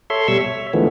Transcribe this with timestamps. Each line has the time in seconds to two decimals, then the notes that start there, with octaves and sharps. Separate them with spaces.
0.10 A4 C#5 E5 C6
0.28 B2 G3 E5 C#6 E6
0.41 C#5 E5
0.73 D3 E3 F3 G#3 A3 B3